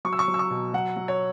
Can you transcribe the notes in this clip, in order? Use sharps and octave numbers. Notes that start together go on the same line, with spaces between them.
F#3 C#6
E6
C#6
F#3
E6
C#6
B2
F#3 F#5
F#3
C#5